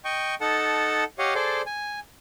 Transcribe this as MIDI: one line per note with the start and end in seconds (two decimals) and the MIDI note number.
0.05 0.35 75
0.05 0.35 79
0.05 0.35 85
0.41 1.04 63
0.41 1.04 69
0.41 1.04 78
0.41 1.04 81
1.19 1.34 67
1.19 1.34 73
1.19 1.34 75
1.19 1.34 77
1.19 1.34 78
1.35 1.62 68
1.35 1.62 69
1.35 1.62 72
1.35 1.62 74
1.66 2.00 80